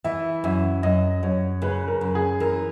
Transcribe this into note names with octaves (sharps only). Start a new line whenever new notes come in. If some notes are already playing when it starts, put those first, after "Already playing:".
E3 E5
F#2 E5
F#2 D#5
F#2 C#5
C#3 B4
A#4
F#2
G#4
E3 A#4